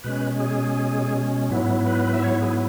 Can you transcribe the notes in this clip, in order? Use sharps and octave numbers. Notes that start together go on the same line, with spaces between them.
B2 G#3 C#4 B4
G#4
G#2 F#3 B3 E4
B4
E5
C#5
G#4